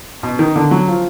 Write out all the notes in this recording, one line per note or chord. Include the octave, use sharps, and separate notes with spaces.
B2
D#3
D3
F#3
F3